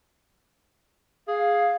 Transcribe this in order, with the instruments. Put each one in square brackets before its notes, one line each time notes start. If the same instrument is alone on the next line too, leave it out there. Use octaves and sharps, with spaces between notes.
[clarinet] G#4 [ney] F5